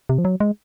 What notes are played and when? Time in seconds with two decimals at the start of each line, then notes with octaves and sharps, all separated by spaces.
0.09 C3
0.18 F3
0.25 F#3
0.40 G#3